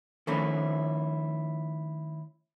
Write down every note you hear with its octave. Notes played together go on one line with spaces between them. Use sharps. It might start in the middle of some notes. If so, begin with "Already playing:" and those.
D#3 F3 A3 C4 C#4 E4